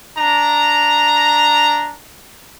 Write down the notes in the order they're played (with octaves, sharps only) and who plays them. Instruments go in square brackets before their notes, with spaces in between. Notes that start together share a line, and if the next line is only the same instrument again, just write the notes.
[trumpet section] D4 A#5